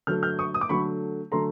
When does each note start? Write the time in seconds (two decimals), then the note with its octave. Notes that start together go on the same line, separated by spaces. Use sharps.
0.07 D3 F#3 A3 F6 G6
0.23 F6 G6
0.39 C#6 D#6
0.54 D#6
0.61 D6
0.69 D3 F#3 A3 B5 C#6
1.32 D3 F#3 A3 A#5 C6